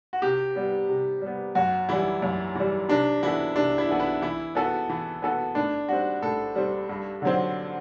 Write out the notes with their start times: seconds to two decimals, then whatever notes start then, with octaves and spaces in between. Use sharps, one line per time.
0.13 F#4
0.22 C3 G4
0.56 G3 B3
0.89 C3
1.22 G3 B3
1.55 F#2 F#4
1.89 E3 G3 E4
2.22 F#2
2.55 E3 G3
2.89 C3 D4
3.23 E3 B3 E4 F#4 A4
3.56 C3 D4
3.78 E4
3.89 E3 B3 F#4 A4
4.00 E4
4.22 E3 E4
4.55 B3 F#4 A4
4.89 E3
5.22 B3 F#4 A4
5.55 A2 D4
5.89 G3 C4 F#4
6.22 A2 A4
6.55 G3 C4
6.89 G2
7.22 D3 F#3 C4